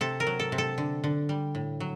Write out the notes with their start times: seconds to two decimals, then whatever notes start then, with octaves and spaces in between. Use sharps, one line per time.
0.01 C3 A4
0.20 A#4
0.27 F#3
0.40 A4
0.52 C3
0.58 A4
0.78 D3
1.04 D3
1.29 G3
1.55 A2
1.80 F#3